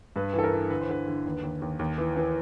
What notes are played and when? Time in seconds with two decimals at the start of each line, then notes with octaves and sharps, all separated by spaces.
0.16 G2 B4
0.34 E3 A4
0.44 A#4
0.53 E3
0.70 D3 B4
0.81 C5
0.89 D3 B4
1.08 D3
1.25 D#2
1.43 D#2
1.62 D#2
1.79 D#2
1.98 E3
2.16 E3